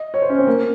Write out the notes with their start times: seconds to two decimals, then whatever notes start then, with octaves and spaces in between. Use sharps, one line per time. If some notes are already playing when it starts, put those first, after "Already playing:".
Already playing: D#5
0.14 C#5
0.22 C5
0.29 C#4
0.38 C4
0.47 A#3